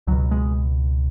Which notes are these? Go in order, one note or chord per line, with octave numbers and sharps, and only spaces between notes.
C#2 B2 F#3
G#3